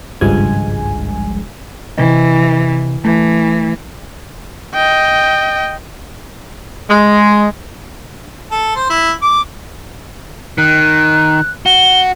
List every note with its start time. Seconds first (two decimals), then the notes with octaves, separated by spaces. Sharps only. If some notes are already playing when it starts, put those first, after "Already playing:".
0.21 G#1 C#2 G2 F3 G#3 G#5
1.98 C3 E3 D#5
3.04 E3 A3
4.74 D#5 G5
6.89 G#3
8.51 A4
8.76 C5
8.90 E4
9.22 D6
10.58 D#3 F#6
11.66 F#4 G7